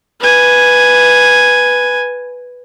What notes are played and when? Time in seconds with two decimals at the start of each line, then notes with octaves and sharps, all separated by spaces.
0.20 B4 G#5